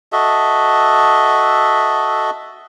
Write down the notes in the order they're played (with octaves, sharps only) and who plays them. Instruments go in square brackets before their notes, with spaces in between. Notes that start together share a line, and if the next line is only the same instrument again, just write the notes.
[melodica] F#4 A4 D#5 E5